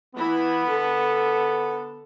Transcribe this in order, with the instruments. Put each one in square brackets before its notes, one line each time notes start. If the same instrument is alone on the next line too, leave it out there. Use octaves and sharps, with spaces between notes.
[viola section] E3 E4 B5 [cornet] B3
[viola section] D3 A4